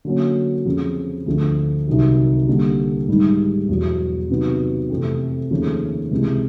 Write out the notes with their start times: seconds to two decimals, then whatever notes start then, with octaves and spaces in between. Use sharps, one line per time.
0.05 D3 F#3 A#3 C#4
0.66 F2 C#3 F3
1.26 D2 D3 F3 A3 D4
1.87 C2 C3 D#3 F#3
2.48 D3 G3 A#3 D4 G4
3.08 G#2 D#3 G3
3.69 E2 B2 F#3
4.30 C3 D#3 F#3 B3
4.90 F2 C3 E3 A3 C4
5.51 D#2 C#3 F3 A3
6.11 C#2 C3 E3 G#3